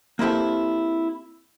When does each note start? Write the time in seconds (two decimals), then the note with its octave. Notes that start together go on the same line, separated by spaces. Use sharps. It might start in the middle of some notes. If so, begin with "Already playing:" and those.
0.19 A#3 C4 E4 G4 A4